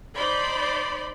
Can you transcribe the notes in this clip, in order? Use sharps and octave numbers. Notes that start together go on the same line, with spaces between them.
D#4 C5 D5 B5 C6